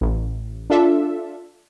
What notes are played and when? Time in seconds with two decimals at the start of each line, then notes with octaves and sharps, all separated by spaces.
0.01 A1
0.70 D4 F4 A4 E5